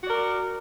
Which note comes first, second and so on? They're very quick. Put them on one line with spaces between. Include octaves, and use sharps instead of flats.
F#4 D5 A#4